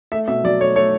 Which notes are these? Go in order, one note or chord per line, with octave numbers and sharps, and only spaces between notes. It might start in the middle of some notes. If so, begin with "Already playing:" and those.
A3 E5
B2 E5
F#3 D5
A3 C#5
A3 C#5